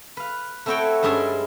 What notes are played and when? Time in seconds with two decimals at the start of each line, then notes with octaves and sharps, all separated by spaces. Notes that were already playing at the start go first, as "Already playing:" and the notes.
0.17 B4 F5
0.66 A3 C4 E4 F#4 C#5 G5
1.03 G2 G#3 C#4 G#4 E5 A5